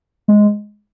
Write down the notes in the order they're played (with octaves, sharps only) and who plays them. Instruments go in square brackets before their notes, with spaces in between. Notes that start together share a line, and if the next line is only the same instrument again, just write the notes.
[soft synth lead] G#3